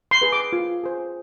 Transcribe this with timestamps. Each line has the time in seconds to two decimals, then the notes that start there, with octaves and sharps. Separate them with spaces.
0.11 C6
0.22 G#4 B4
0.32 D6
0.53 F4
0.83 G#4 C5